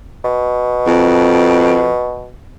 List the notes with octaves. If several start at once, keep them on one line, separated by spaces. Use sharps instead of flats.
B2
F2